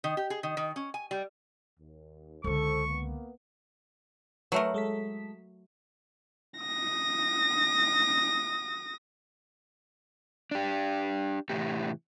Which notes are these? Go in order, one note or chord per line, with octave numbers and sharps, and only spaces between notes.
D#3
G4
G#4
D#3
D#3
C#4
G#5
G3
D#2
C#2 D3 A4 C5 C#6
A#3 B3
F#3 A3 A#4 B4
G#3 A4 B6
D#6 A#6
D4 G4
A2 C3 E3 G4